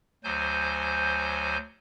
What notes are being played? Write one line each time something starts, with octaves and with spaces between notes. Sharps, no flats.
D2 F#3 C5 G#5 G6